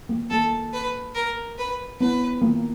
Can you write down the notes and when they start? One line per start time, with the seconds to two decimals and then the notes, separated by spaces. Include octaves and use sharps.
0.09 A#3
0.30 A#3 A4
0.73 B4
1.15 A#4
1.58 B4
2.00 B3 B4
2.42 A#3